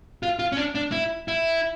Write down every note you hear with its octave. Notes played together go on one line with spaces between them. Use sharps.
F4
F4
C#4
D4
D4
E4
E4